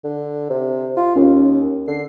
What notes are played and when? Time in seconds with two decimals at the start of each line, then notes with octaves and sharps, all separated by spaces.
0.04 D3
0.50 C3
0.97 F4
1.16 D#2 C#4
1.88 D3 C7